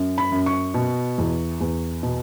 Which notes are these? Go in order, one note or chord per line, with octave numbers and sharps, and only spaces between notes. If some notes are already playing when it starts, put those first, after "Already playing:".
Already playing: F#2
B5
F#2
C#6
B2
E2
E2
B2